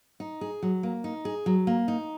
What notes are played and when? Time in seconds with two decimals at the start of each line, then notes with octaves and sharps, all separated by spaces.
0.20 D#4
0.41 G#4
0.63 F#3
0.83 A#3
1.04 D#4
1.25 G#4
1.46 F#3
1.67 A#3
1.88 D#4